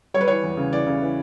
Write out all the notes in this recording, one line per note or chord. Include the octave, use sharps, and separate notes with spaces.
G3 C#5
B4
E3 C#5
E2
C#3
E3 D5
C#3
E3